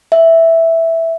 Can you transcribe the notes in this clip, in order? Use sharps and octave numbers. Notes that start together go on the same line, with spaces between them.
E5